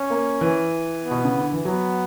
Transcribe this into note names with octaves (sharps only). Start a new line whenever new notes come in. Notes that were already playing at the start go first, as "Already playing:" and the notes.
Already playing: C#4
A#3
E3
B3
B2
C#3
D3
E3
F#3 B3